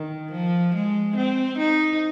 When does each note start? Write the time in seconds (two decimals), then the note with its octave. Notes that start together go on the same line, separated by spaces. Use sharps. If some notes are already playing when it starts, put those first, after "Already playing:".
Already playing: D#3
0.32 F3
0.75 G#3
1.16 C4
1.58 D#4